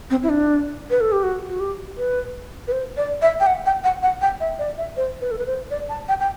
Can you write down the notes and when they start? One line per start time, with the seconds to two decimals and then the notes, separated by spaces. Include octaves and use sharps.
0.10 C4
0.23 E4
0.29 D4
0.90 B4
1.01 A4
1.12 G4
1.23 F#4
1.49 F#4
1.60 G4
1.97 B4
2.67 B4
2.72 C5
2.97 D5
3.22 E5
3.40 G5
3.46 F#5
3.66 G5
3.84 F#5
4.03 F#5
4.22 G5
4.40 E5
4.59 D5
4.78 E5
4.97 C5
5.21 B4
5.31 A4
5.38 B4
5.46 C5
5.71 D5
5.89 A5
6.08 G5
6.20 G5